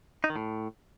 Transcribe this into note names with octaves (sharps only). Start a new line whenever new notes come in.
D#4
D#3
A2